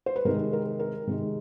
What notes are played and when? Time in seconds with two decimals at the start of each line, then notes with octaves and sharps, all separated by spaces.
0.06 C5
0.16 B4
0.25 C3 D#3 G#3 A#4
0.53 A#4
0.80 A#4
1.07 C3 D#3 G#3